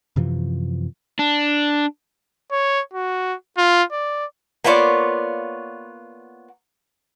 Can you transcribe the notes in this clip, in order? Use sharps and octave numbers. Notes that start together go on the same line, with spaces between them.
F#2 C3 E3 F3
D4
C#5
F#4
F4
D5
A#3 B3 F4 C#5 D5